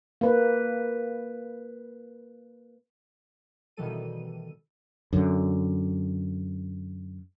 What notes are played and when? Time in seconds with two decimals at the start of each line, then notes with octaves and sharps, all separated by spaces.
0.21 A#3 B4
3.77 B2 D#3 E3 G3 A4 D#7
5.13 F#2 D3